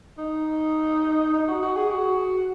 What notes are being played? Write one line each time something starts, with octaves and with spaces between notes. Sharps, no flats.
D#4
D#4
F#4
F#4
G#4
F#4